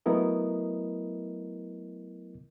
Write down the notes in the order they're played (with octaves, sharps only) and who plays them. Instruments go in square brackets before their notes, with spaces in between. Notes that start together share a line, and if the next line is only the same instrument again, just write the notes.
[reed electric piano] F#3 A3 B3 E4 A#4 D#5